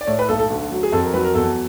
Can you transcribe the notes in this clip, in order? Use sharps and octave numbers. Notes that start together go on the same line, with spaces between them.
D5
A2 C#5
B4
B1 A4
A4
D2
F#3
G#4
F2 A4
A#4
F#3 B4
A#4
E2 A4